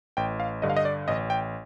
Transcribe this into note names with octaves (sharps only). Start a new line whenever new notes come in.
A1 G5
F5
G2 D3 D#5
F5
D#5
D5
A1 D#5
G5